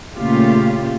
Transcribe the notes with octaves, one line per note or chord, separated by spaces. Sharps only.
A#2 C#3 A3 F4 G4